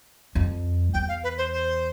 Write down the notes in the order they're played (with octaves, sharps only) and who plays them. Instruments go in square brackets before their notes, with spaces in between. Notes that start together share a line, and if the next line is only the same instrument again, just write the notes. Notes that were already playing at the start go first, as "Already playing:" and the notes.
[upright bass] F2
[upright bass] E2 [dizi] G5
[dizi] F5
B4
C5
C5